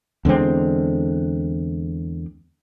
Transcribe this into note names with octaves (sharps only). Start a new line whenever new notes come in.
E2 D3 G#3 C4